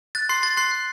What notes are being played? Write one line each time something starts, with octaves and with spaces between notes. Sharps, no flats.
F#6 A6
C6 F#6 C7
C6 A6
C6 F#6 C7
F#6